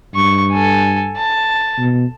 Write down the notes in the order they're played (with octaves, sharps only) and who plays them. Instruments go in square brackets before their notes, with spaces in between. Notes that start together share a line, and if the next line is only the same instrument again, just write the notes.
[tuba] G2 [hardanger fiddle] C#6
[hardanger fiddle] A4 G#5
A5
[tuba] B2